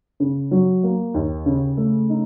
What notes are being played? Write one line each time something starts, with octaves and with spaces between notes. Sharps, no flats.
C#3
F#3
A#3
D#2
C#3
A3
D#4